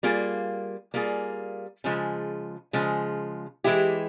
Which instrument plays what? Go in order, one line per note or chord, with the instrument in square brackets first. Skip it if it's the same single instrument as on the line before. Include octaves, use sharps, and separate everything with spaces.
[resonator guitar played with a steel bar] G3 A#3 F4 G#4
G3 A#3 F4 G#4
C#3 F3 G#3
C#3 F3 G#3
E3 G#3 E4 G4